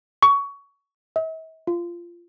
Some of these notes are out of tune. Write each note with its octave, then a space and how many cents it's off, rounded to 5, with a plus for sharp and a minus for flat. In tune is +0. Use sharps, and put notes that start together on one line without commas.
C#6 +20
E5 -45
F4 -15